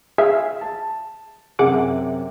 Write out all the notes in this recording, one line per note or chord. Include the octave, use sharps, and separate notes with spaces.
G#4 E5 F5
A5
F#2 C3 G#4 F#5 D6